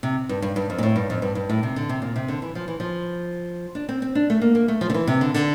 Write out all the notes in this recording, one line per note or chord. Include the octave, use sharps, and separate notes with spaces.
C3
G2
G2
G2
F2
A#2
A2
G2
F2
G2
G2
A2
C3
D3
C3
A#2
C3
D3
E3
F3
E3
F3
D4
C4
C4
D4
A3
A#3
A#3
A3
F3
D3
E3
C3
D3
D3